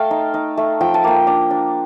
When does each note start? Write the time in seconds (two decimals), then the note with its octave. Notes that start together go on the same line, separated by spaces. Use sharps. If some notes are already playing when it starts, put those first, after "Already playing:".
Already playing: A3 F5 G5 A5
0.11 D#4
0.34 D#4
0.57 A3
0.81 F3 G5
0.94 A5
1.04 A#3 G5
1.27 D4
1.50 D4